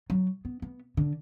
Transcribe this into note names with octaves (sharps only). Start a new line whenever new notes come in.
F#3
B3
B3
D3